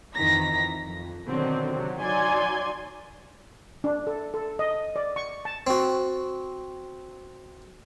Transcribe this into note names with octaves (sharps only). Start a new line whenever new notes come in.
F2 D#3 E3 A#5 A#6 B6
F2
B2 D3 D#3 F#3 C4
C3 F#3
F#3 D#4 D5 G#5 C6 G#6
D4
A4
A4
D#5
D5
C#6
A5
C4 F#4